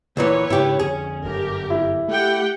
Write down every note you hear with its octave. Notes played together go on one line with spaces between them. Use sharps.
D2 A#2 E3 B4 C#5
G#2 C#3 D4 E4 G4
F2 D3 C#4 G#4
G1 F#2 D3 G4 A#4
E4
A3 G4 F#5 G5